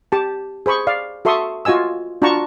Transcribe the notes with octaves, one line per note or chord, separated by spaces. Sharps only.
G4 A5
G#4 C5 B5 C#6
D5 F5
F#4 A4 E5 C6 C#6 D#6
F4 F#4 D#5 G#5 E6
D4 F4 F#4 A5 A#5 C#6